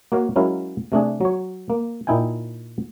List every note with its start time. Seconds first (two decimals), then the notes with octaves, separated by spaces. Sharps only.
0.12 A#3 F#4 C#5 F5
0.36 F#3 G#3 C#4 E4 A#4 F5
0.92 C3 A3 D4 G#4
1.21 F#3 C#5
1.70 A#3
2.07 A#2 D#4 E4 G5 G#5